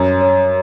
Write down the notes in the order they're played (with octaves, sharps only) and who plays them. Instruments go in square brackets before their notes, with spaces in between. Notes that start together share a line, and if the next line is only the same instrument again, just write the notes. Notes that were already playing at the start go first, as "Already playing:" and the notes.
Already playing: [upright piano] F#2 [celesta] C#5
[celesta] C#5